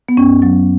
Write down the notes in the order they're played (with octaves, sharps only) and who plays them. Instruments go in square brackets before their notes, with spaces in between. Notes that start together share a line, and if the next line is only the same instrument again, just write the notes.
[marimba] B3
F#2 C#4
F#3